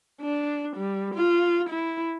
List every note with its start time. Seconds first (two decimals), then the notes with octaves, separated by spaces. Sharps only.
0.21 D4
0.77 G3
1.15 F4
1.69 E4